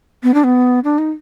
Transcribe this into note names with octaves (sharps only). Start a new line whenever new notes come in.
B3
D4
B3
D4
D#4